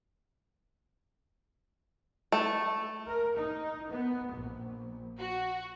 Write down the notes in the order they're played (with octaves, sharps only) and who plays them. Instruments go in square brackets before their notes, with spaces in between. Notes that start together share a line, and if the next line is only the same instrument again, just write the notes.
[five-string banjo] A3
[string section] A#4
D#4
B3
A#1
F#4